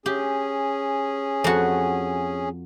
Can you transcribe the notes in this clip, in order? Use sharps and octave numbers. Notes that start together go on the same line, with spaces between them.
C#4 G4 G#4
F2 F#4